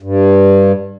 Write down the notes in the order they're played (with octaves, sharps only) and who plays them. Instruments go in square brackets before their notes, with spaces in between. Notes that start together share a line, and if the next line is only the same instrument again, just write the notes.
[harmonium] G2